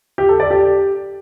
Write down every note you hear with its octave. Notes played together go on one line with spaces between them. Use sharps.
G4
A4
D5
G4